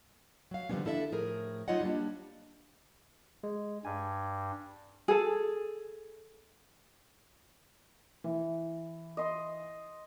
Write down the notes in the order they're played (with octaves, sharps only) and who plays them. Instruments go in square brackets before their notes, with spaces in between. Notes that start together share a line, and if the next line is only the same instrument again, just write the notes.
[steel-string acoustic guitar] F#3 F5
D3 D#3 F3 G3 B3 C#4
D4 E4 A4 D#5 E5
A2 F3 G#4 A#4
F#3 D#4 F4 C#5 D#5 F#5
G3 A#3 D4
[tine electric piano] G#3
[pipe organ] G2 [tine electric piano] G#5
[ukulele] G#4 A4
[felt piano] E3
[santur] D#5 C6